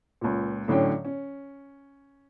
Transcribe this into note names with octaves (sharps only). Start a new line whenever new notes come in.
C#2 A#2
A2 D3 F#3 C#4 G5
C#4